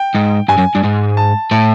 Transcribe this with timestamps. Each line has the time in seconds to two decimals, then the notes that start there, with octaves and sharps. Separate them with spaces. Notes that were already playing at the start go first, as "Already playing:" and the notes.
Already playing: G5
0.15 G#2
0.49 G2 G#5
0.58 F#2
0.75 G2
0.84 G#2
1.17 A5
1.51 A2 A5